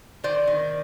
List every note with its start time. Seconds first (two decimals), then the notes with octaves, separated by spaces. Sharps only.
0.24 D#3 C5 D5
0.47 D#3